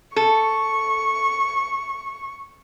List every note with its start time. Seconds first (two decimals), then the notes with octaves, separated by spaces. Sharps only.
0.16 A4 C#6